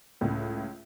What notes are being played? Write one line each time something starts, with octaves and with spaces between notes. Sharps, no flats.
C#2 A2